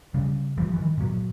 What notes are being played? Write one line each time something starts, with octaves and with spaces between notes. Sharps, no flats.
C#3 G3
E3 F3 G3
D#3 E3
A#2 F#3